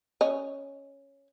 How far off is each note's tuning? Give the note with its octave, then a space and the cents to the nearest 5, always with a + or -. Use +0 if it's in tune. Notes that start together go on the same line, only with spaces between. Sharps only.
C#4 +0 D#5 +0